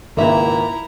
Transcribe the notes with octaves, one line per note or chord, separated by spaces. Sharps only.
G#1 C#2 A#3 E4 E5 A#5